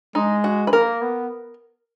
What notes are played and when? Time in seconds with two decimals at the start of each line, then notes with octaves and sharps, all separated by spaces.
0.15 G#3 D#4
0.44 F#4
0.67 B4
0.73 A#3 A#4
1.02 B3